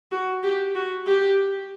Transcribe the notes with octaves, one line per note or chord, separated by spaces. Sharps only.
F#4
G4
F#4
G4